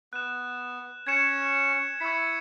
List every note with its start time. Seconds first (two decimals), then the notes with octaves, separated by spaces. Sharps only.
0.13 B3 F#6 E7
1.07 C#4 G#6 C#7 E7
2.00 E4 C#6 E6 G#6 B6